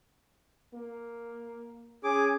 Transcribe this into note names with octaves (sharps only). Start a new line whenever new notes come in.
A#3
C#4 G#4 D6